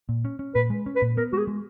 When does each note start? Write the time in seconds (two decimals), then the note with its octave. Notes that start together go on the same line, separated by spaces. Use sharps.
0.09 A#2
0.25 C#4
0.39 C#4
0.55 A#2 B4
0.70 G#3
0.86 C#4
0.96 B4
1.02 A#2
1.17 B3 A#4
1.33 G#3 F#4
1.38 G#4
1.47 G#3